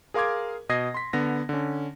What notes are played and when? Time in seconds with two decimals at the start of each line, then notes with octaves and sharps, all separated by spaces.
0.14 G#4 A#4 F5 C6 D6 G#6
0.69 B2 D#5 D#6 G#6 A#6 C7
0.94 C6 B6
1.13 D3 B3 A#6
1.49 D3 C#4